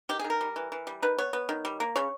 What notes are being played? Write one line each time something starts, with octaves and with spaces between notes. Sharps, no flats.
D#3 G4
G#4
D#3
A#4
G3
E3
E3
G3
D#3 B4
B3 C#5
B3
D#3
G3
A#3
C#3 C#5